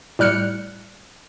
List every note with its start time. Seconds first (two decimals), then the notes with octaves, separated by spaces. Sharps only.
0.19 A2 G3 F6 F#6 C#7